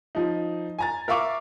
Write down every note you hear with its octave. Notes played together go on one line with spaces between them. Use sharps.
F3 D#4
G#5 A#5 A6
A#4 E5 F5 C#6 D6